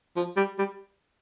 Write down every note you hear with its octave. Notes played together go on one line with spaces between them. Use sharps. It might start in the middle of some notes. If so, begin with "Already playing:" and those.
F3
G3
G3